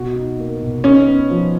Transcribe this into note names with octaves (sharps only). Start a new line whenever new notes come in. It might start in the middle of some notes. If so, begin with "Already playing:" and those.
Already playing: B2 F#4
D#4
A#3
B2
C#4 D#4
B3
F3